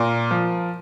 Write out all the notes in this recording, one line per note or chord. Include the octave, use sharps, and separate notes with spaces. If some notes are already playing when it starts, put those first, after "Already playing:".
Already playing: A#2 A#4
F3